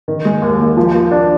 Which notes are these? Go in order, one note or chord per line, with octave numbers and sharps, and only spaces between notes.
D#3
G#3
D#2
D#2
F3
A#3
D4